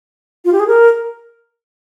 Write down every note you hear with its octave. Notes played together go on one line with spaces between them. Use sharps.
F4
G4
G#4
A#4